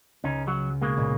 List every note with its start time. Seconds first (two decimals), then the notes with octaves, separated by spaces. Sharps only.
0.24 C#2 C#4 D#4
0.47 F#3 F#4
0.82 B2 G#3 A#3
0.97 C#2 A#2